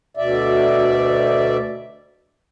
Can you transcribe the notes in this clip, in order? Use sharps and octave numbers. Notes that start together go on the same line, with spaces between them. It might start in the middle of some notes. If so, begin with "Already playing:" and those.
D2 B2 D5 E5